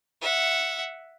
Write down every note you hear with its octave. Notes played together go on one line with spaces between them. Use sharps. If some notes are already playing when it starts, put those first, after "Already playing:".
E5 F#5